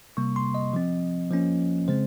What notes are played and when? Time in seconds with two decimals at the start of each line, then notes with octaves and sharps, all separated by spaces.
0.17 C3 G3 A#3 C#6
0.36 C6
0.54 D#5
0.73 F3 C4
1.31 F3 A#3 C#4
1.88 C#3 G#3 C4 C5